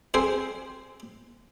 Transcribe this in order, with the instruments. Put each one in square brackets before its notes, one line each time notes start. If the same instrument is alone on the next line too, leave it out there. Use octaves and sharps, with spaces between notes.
[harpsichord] C4 G#4 C5